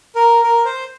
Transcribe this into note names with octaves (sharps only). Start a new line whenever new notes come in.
A#4
A#4
C5